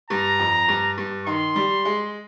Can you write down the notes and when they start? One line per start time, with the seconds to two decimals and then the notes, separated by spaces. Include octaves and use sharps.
0.10 G2 A#5
0.40 F2
0.68 G2
0.98 G2
1.27 D#3 C6
1.56 G3
1.85 G#3